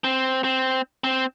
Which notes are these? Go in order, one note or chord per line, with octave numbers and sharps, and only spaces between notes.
C4
C4
C4